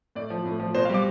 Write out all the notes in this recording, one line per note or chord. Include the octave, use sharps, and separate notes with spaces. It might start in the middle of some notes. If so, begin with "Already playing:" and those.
A2 D5
F3
A2
F3
B2 C5
F5
G3 D6